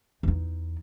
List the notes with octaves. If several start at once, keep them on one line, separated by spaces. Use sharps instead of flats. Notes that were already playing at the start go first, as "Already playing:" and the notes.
E2 D#4